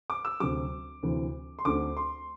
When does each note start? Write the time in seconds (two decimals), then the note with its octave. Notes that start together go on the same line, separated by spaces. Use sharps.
0.10 D6
0.25 E6
0.40 D2 C3 F#3 D6
1.03 D2 C3 E3
1.59 C6
1.65 D2 D3 A3 C4 D6
1.97 C6